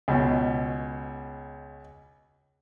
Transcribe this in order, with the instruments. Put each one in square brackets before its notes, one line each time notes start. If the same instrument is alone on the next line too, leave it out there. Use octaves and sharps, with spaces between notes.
[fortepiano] C#2 B2